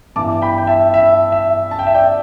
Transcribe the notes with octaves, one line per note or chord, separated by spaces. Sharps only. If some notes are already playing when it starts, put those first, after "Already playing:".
G2 E3 B3 A5 D6
G5 B5
G5
E5 A5
E5
E5
A5
G5
E5
D5 G5